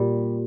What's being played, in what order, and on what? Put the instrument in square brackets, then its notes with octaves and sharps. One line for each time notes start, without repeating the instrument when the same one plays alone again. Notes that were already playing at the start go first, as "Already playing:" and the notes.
Already playing: [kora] A#2 G3